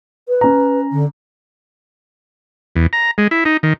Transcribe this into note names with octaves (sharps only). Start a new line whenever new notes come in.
B4
C#4 A#5
D3
E2
A#5
G#3
E4
D#4
D#3